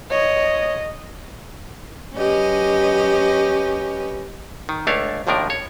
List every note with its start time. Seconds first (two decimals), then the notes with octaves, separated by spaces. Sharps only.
0.11 C#5 D#5
2.13 F#3 C#4 G4 B4 D#5
4.69 D#3
4.87 C#2 A3 D4 C#5 F5
5.27 G#1 D#2 A2 F3 D4 A#4
5.50 C#5